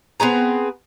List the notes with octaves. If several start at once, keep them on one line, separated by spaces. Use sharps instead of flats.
B3 C4 G#4 A#5